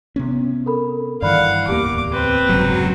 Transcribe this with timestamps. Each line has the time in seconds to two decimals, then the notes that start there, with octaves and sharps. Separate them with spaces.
0.16 C3 B3 C#4
0.66 A4 A#4 B5
1.22 G2 D#3 E3 D5 F5 F#5 B5
1.68 D1 E2 A#3 G4 A5 D6
2.12 C4 B4
2.49 F1 G#2 C#3 F#3